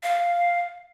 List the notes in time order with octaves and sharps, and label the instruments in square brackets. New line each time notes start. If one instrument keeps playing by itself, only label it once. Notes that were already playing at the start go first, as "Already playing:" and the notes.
[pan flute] F5